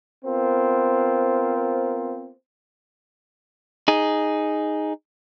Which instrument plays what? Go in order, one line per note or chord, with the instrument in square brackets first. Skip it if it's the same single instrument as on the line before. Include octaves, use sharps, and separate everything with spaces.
[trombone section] B3 C4 F4 A#4 C5
[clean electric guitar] D#4 G#4